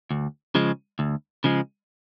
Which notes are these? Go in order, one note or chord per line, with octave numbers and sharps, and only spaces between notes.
D2
C#3 F3 G#3
D2
C#3 F3 G#3